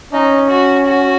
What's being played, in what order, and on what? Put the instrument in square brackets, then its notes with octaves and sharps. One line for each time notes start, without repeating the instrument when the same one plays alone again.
[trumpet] C#4 [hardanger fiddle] D#4
[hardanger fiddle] F#4
F#4